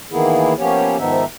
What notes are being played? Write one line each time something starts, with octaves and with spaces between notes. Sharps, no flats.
D#3 E3 A#3 B3 E4 G#4
F3 A#3 B3 C#4 G4 C#5
G#2 D#3 F3 B3 D#4 E5